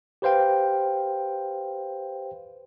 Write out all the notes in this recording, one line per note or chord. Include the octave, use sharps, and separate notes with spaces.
G4 B4 C5 F5 G5